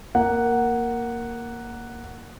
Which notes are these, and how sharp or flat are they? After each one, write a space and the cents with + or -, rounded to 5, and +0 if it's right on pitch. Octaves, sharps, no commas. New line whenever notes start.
A#3 +0 F#5 +0